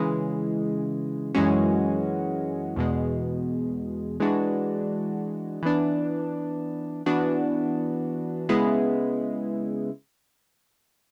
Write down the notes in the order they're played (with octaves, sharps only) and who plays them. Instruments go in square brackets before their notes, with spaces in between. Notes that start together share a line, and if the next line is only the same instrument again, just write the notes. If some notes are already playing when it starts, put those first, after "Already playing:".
Already playing: [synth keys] C#3 E3 G#3
F#2 E3 G#3 C#4 F#4
E2 B2 G#3
E3 G#3 D4 F#4
E3 B3 D4
E3 B3 D4 F#4
C#3 G#3 B3 E4